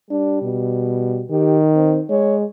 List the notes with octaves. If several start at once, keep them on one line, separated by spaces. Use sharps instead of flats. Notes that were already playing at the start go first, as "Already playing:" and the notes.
G3 D4
B2
D#3 G4
C4
G#3 C#5